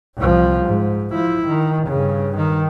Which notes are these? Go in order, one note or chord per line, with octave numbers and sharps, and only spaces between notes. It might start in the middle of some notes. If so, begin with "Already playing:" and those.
C2 F3
G#2
F3 E4
D#3
G2 C#3
D#3